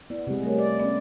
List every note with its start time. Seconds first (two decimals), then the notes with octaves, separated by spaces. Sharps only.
0.10 B3 E4 D5
0.27 C3 G#3
0.43 G3 A3 A#4 C#5
0.58 D5
0.80 B3 C#4 D5